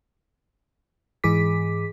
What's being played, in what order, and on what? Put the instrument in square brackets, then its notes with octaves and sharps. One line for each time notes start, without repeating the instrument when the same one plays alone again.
[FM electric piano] G#2 E3 G#4 D6 B6